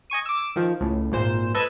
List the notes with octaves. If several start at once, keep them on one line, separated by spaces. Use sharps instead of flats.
D#5 G#5 C#6 D#7
D6 E6
D#3 F3
C#2 A2
G#1 A#2 C5 E7
A4 B4 D#5 E6 G#6